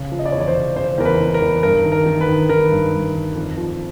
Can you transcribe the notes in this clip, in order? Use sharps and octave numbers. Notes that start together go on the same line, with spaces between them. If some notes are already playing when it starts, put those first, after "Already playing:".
Already playing: C#3
F3
D#5
D5
E2 C#5
D5
C5
C#3
C#3 C5
E2 A#4
B4
E2
A#4
E2
G2 A#4
D#3
A#4
D#3
B4
D#3
D#3 A#4
G2
G2
D#3
F2
F3